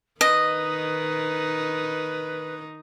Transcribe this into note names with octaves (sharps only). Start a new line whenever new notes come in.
D#3 D#4 B4 D#5